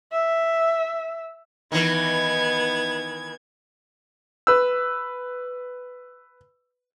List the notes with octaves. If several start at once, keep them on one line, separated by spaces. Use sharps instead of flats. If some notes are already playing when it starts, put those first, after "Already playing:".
E5
D#3 E3 B3 G#6
B4 E6